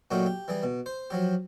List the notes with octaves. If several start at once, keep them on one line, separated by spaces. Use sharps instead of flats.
A#2 F#3 A3 D#4 F#4 G4
G4
E3 G3 G#4
B2
C5
F3 F#3 G4